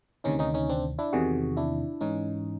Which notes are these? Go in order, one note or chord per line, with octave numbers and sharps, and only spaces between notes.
D2 C3 D#3 C#4 D#4
C#4 D#4
C#4 D#4
C4 D4
D4 E4
E2 C3 D#3 F#4 G#4
D4 E4
G#2 E3 C#4 D#4